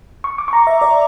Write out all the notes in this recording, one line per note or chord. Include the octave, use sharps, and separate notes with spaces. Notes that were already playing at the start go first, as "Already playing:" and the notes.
C#6
D6
C#6
A#5
E5
D5